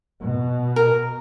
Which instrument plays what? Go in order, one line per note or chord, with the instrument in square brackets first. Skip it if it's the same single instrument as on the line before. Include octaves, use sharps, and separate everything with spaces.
[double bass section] B2
[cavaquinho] A#4